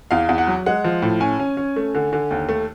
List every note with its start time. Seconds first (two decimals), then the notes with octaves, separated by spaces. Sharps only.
0.11 E2 F5
0.29 E2
0.38 F#5
0.47 F#3
0.66 G#3 F#5
0.84 F3
1.02 A2
1.20 C#4 G#5
1.39 C#4
1.57 C#4
1.76 A3
1.95 D3
2.13 D3
2.31 D#2
2.49 A3